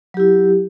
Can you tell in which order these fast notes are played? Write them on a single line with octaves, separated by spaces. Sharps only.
F#3 G4 E4